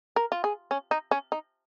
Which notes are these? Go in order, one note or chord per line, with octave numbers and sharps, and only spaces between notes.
A#4
F4
G#4
C#4
D#4
C#4
D#4